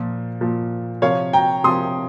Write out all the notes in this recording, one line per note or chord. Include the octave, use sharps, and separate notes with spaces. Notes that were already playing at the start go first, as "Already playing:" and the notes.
Already playing: A#2 F3
A#2 F3
C3 F3 C#5 F5
G5 A#5
C3 F3 C6 D#6